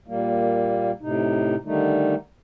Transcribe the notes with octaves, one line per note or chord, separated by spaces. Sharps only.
A#2 G3 A#3
A2 C3 D#4
D3 D#3 G3 A3 D#4